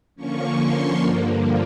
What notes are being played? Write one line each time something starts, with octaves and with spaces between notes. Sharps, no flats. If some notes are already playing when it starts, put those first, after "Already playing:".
D3 F3 A#3 C#4 C#6
C6
G2 D3 F3 A#3